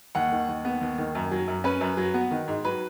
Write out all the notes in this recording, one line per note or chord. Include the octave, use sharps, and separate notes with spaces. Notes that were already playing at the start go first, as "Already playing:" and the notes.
D#2 F#5
D#3
D#2
B3
D#2
D#3
F#2
F#3
F#2
C#4 B4
F#2
F#3
B3
D#3
G#2
F#3 B4